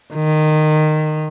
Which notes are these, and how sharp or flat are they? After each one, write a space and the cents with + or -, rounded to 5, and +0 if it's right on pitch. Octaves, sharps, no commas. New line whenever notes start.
D#3 -15